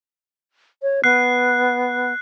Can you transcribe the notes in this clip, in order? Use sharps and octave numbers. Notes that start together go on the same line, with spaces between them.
C#5
B3 F#6 C7